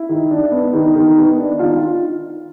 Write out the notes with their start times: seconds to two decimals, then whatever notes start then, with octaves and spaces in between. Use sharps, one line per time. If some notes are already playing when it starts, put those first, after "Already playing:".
Already playing: E4 E5
0.09 D#3
0.31 D4
0.51 B3
0.73 D#3
0.95 D#3
1.17 B3
1.38 D4
1.59 D#3 F4 F5